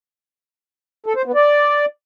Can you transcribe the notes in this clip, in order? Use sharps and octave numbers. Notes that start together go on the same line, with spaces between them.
A4
C5
B3
D5